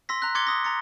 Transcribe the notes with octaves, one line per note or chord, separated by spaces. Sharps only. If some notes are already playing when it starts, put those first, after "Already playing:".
C6 E6 A#6 B6
A#5 F#6
C6 D6 G#6 A6 C#7 G7
D#6 A#6
A#5 A6 C#7